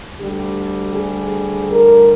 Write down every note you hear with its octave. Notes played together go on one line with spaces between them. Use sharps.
D2 D3 G3 G4
G#4
A#4